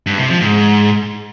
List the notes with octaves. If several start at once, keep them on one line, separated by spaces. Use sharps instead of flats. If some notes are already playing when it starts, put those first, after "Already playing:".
G2
C3
F3
G#2